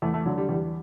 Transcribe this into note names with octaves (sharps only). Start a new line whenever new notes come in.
E2 A3
A3
D3 F#3
G3
E2 G3